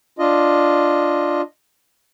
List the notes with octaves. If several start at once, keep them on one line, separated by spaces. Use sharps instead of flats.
D4 F4 D#5